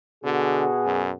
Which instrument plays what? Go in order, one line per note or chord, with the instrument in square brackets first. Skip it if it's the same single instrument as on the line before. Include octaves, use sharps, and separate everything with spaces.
[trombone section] B2 F#4 G#4 [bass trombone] D3
[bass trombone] F#2